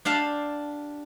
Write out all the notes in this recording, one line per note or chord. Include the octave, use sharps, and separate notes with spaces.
D4 G4 F5 A5